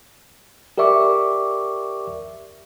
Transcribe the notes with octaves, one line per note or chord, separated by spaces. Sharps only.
G4 A#4 D5 E5 C#6 D6